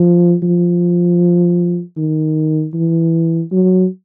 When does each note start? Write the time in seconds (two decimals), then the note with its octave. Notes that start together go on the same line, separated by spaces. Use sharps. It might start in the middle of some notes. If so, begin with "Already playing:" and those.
Already playing: F3
0.43 F3
1.97 D#3
2.74 E3
3.52 F#3